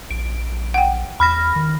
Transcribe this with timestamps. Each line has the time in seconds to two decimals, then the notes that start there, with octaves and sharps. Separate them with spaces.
0.11 A#1 D7
0.74 F#5 G5
1.20 E2 B5 F6 A#6
1.56 D#3